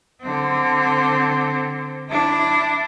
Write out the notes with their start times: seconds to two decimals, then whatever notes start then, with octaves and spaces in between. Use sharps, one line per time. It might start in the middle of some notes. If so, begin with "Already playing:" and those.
0.22 D3 C4
2.10 D4 E4